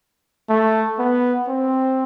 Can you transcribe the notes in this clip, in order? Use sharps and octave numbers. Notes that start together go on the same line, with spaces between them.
A3
B3
C4